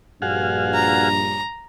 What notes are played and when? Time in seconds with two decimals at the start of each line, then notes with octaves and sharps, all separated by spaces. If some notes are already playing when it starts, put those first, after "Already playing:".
0.22 A#1 G2 F#4 G#4 F5
0.74 A#5